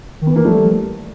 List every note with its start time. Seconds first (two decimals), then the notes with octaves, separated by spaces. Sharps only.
0.21 D#3
0.27 B3
0.33 E3 A#3
0.45 F3 G3 A3